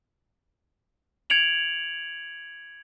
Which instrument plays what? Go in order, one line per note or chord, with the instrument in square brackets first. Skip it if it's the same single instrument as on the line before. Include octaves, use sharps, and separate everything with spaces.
[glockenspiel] G#6 C#7 D7 F7 F#7